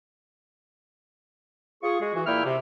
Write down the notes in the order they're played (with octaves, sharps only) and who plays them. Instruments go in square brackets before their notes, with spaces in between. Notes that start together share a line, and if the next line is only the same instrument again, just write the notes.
[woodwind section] F4 G#4 C#6
G#3 F#4 G#4
E3 F#4
A#2 A#3 E4 E5 G5 F6
C3